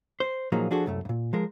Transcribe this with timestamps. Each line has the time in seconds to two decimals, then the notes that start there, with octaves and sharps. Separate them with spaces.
0.20 C5
0.52 A#2 F3 F#3 A#3 D#4 G#4
0.71 F3 D4 F#4 G#4 A4
0.86 C2 F#2 A3
1.05 G2 A#2
1.33 F3 G#3 A#4